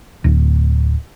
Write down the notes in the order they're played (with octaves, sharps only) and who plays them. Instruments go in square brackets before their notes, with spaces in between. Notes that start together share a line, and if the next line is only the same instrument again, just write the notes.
[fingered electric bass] D1